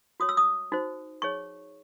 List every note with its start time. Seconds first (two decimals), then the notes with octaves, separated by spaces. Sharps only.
0.20 F#4 C#5 D#6
0.29 E6
0.37 D#6
0.72 D#4 F#4 C5
1.22 D#4 G#4 C#5 C#6